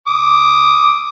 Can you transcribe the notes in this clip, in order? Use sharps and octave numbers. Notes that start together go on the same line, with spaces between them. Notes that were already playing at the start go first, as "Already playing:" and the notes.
D6 D#6